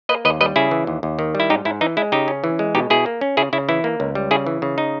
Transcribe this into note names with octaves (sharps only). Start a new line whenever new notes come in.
A#3 B4 D#5
D#2 B4 D#5
G3 B4 D#5
C#3 E4 G#4
E3
D#2
D#2
D#3
G3
E4
G#2 D#4 G4
G#2 E4
E3 D#4
G#3 E4
C#3 D#4 G4
C#4
E3
G#3
B2 D#4 G4
B2 E4 G#4
A#3
C#4
C#3 E4 G#4
C#3 E4
E3 E4
A#3
C#2
G3
C#3 E4 G#4
E3
C#3
D#4